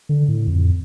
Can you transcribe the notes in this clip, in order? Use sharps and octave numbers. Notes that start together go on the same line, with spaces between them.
D3
A2
F2